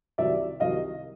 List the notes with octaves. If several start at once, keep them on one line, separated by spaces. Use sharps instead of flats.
C2 C3 D#3 F#3 D5 E5
C2 C3 D#3 F#3 D#5 F5